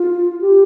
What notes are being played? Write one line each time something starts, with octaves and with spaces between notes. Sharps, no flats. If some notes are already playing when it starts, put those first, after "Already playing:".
Already playing: F4
G4